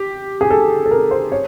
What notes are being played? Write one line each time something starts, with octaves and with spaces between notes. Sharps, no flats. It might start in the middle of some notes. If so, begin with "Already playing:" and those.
Already playing: G4
G#4
A4
A4
A#4
C5
C#5